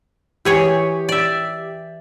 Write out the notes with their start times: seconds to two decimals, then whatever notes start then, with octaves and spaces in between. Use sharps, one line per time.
0.45 E3 G4 G#4 C#5
1.09 D5 E5